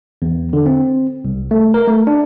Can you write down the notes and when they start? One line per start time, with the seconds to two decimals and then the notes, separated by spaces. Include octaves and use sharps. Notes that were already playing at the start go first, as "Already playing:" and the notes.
0.22 E2
0.53 D3
0.66 C4
1.25 C2
1.51 A3
1.74 A#4
1.87 A3
2.07 D4